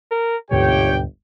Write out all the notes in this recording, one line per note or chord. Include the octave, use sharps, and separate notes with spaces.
A#4
G1 D2 G#2 B2 G4 C#5 G5